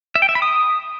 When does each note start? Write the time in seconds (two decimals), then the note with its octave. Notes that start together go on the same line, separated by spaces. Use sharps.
0.16 E5
0.22 G5
0.29 E5
0.35 B5
0.42 D#6